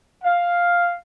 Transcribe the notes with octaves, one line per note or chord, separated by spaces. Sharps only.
F5